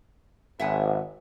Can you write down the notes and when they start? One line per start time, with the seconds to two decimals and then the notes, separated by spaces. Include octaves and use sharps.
0.60 G#1 E5 F#5 G#5